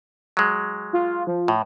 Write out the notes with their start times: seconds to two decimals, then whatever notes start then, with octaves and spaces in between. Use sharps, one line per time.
0.37 F#3 G#3
0.93 F4
1.27 F3
1.48 A2